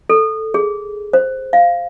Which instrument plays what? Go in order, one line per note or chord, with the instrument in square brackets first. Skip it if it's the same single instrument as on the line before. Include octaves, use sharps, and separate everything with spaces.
[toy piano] A4
G#4
C5
F5